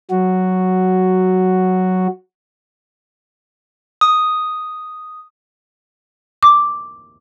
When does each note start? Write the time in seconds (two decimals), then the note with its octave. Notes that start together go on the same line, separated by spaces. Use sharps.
0.10 F#3 F#4
4.01 D#6
6.43 D6